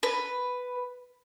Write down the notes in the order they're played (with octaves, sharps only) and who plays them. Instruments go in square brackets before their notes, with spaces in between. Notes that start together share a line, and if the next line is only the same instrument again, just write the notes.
[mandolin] B4